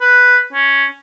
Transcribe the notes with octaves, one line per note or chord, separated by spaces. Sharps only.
B4
C#4